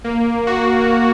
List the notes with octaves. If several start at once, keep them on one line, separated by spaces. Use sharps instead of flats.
A#3
F#4